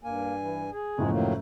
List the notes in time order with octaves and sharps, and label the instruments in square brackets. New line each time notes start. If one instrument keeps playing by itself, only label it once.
[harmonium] G2 G#5 [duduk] A#3
[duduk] E3
G#4
[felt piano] F#1 A2 F3 [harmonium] E2 G#3
[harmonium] D#3 F#3 A#3 [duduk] A3